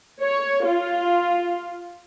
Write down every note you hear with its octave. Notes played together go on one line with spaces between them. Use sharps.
C#5
F4